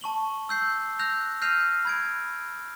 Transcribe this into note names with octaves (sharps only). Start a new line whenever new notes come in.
A5 C#6 F#7 G7
E6 G6 C7
E6 F#6 G6 A#6 F7
F6 G6 A#6 C7 D#7 F7
B5 G#6 D7